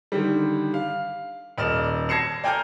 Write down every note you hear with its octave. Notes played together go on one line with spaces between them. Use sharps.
D3 D#3 G3
F5
D#1 D5 D#5 F6 E7
A5 G#6 A#6 C7 C#7 E7
D5 G5 G#5 A#5 F6 G6